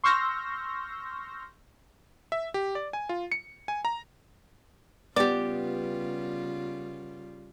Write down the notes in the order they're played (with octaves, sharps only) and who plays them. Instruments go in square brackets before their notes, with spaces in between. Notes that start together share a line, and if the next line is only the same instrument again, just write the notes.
[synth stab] C6 C#6 E6 F6 G6 A#6
[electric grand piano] E5
G4
D5
G#5
F4
C#7
G#5
A#5
[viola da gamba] C#3 G3 F4 [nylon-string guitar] B3 G4 [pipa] D5